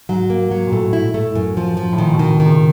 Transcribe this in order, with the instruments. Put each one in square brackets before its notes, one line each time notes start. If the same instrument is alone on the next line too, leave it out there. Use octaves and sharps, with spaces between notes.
[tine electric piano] G#2 [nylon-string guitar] F#3
[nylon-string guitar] A#3
F#3
[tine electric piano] A#2
[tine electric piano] A2 [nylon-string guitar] A3
[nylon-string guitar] E4
A3
F#2
F3
F3
[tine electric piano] A2
[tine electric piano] A#2 [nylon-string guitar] D#3
[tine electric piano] B2
[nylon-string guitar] D#3
[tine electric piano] C3
[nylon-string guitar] D#3
[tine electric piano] C#3